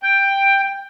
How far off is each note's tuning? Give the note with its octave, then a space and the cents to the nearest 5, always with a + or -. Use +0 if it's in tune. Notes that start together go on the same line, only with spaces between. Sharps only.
G5 +10